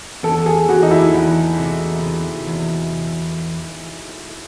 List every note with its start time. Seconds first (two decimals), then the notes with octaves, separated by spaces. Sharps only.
0.23 E2 A4
0.46 G#4
0.69 E2 F#4
0.83 D#4
0.91 E4
1.13 E2
1.58 C3
2.03 C3
2.47 E2